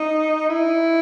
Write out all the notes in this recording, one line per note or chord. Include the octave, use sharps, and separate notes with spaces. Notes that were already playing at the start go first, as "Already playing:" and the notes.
Already playing: D#4
E4